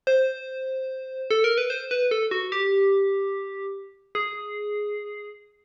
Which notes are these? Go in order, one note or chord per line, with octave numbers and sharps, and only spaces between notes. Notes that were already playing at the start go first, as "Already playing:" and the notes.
C5
A4
A#4
B4
C5
B4
A4
F#4
G4
G#4